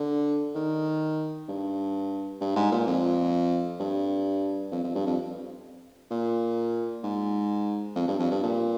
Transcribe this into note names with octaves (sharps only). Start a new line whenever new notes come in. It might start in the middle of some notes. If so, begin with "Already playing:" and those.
Already playing: D3
D#3
G2
G2
G#2
A#2
F2
G2
F2
F2
G2
F2
A#2
G#2
F2
G2
F2
G2
A#2